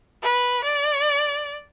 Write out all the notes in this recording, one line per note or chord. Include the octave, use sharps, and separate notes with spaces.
B4
D5